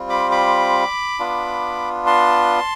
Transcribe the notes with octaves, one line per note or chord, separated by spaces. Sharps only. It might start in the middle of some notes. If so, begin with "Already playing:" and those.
Already playing: G3 C4 F4
B5 D6
B5 D6
B3 D4 F4
A5 C6